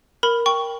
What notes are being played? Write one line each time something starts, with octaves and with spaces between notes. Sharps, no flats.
A#4 B5
G5 C#6